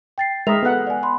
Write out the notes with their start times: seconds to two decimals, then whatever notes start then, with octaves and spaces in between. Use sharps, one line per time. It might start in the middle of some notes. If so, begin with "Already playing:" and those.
0.18 G5 A6 C7
0.47 G#3 A#4 E5 D#6 A#6 F7
0.63 B3 A4 F#5 F#6
0.87 D5 G#5
1.03 B5 C6